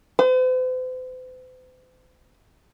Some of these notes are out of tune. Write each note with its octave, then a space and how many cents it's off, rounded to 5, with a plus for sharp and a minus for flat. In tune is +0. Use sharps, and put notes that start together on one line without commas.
C5 -45